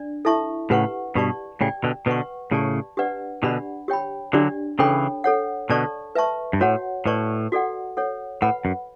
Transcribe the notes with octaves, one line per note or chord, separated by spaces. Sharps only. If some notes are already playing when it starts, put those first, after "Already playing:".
Already playing: D4 D5
E4 A4 E5 A5 C#6
A2 C#3 G4 B4 F#5 C#6
G2 B2 G4 D5 A5 C#6
A2 C#3 G4 D5 G5
B2 D3
B2 D3 B4 F#5 C#6
A2 C#3 G4 D5 A5 C#6
D4 G4 B4 D5 F#5
B2 D3 D4 G4 D5 F#5 B5
G4 C#5 G5 B5
D3 F#3 D4 G4 D5
C#3 E3 D4 A4 C#5 G5 B5
A4 C#5 F#5
B2 D3 A4 D5 A5 C#6
B4 E5 A5 C#6
G2
A2 F#4 C#5 F#5
A2 B4 D5 A5 C#6
F#4 A4 D5 F#5
A4 C#5 F#5
A2 B4 F#5 B5
F#2